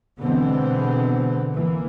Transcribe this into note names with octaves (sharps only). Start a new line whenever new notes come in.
B2 D3 E3 G#3 B3 C4
E3 A#3